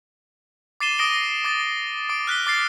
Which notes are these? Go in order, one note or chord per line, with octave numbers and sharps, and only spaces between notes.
D6 A6 C7 D#7 E7 G7
D6 D#6 A#6 D7 G7
D6 A6
D6 D7
F6 F#6 B6 G7
D6 A6 C7